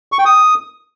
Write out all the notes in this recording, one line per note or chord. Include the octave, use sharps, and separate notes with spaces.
C#6
G5
D#6